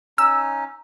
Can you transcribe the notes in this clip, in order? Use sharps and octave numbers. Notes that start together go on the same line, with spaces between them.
C#4 D#4 E6